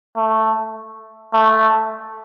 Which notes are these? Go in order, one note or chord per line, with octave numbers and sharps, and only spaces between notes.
A3
A3